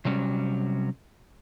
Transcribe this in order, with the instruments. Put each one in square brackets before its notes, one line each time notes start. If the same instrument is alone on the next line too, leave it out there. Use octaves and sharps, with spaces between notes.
[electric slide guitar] C3 F#3 G3 C#4